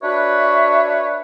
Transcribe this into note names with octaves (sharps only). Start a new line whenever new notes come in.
D4 F#4 B4 C#5 E5